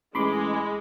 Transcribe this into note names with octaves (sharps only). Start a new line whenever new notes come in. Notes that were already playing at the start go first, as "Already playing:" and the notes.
A1 G#3 B5 C6 D6